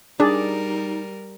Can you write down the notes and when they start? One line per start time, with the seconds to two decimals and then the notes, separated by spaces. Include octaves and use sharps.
0.20 G3 D4 D#4 G#4 A#4 D5